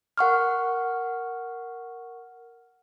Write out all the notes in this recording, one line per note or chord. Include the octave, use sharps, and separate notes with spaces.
A#4 F#5 C#6 F6